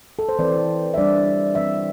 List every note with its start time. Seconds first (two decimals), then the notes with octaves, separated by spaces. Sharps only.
0.19 A4
0.29 C5
0.39 E3 C4 D5
0.94 E5
0.97 E3 G3 D4 D5
1.55 E3 C4 E5